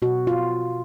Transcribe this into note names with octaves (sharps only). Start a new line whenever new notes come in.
B2 F#4
F4